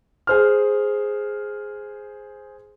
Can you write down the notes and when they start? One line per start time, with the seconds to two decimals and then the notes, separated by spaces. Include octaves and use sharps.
0.27 G#4 C5 F6